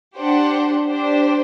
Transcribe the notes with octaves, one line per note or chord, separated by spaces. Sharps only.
D4 G4 C5 F#5
D4 G4 C5